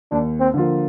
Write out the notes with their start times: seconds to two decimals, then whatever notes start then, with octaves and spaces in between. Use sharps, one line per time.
0.12 D#2 D4
0.40 C4
0.54 D3 F3 A#3 F4